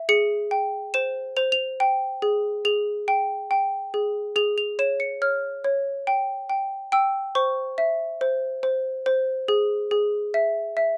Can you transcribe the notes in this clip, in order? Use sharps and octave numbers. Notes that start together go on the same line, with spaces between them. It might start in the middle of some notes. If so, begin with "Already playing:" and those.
Already playing: E5
G#4 C#7
G5
C5 E7
C5 F7
F7
G5
G#4
G#4 F7
G5
G5
G#4
G#4 F7
F7
C#5 E7
C#7
C#5 F6
C#5
G5
G5
G5 E6
C5 C#6
E5
C5
C5
C5
G#4
G#4
E5
E5